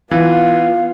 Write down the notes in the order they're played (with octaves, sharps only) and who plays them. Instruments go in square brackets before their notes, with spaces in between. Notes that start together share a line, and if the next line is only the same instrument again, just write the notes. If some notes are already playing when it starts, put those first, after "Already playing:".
[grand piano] E3 [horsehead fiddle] B3 F4 [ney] F5